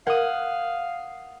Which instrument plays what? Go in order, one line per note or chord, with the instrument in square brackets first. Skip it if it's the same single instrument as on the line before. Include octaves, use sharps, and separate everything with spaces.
[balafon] A#4 [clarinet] F5 [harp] F#5 D#6